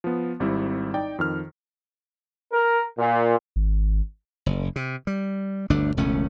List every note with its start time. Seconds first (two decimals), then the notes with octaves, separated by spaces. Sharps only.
0.04 F3 B3
0.40 G#1 G3 C4 E4
0.94 D#4 D5 G5
1.19 F2 D#3 F6
2.52 A#4
2.98 A#2
3.56 G#1
4.46 F#1
4.76 C3
5.07 G3
5.70 G1 D2 A3 D4
5.97 E1 C#2 A3 C#4